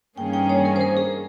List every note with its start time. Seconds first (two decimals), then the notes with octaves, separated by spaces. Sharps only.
0.17 G2 D#3 A#3 C#4 G#4 G5
0.33 G5
0.49 C#5
0.65 A#4
0.76 C5
0.81 A#4
0.97 G#4